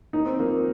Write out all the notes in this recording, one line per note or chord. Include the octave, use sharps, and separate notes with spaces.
D#2 D#4
C4
F3 A#3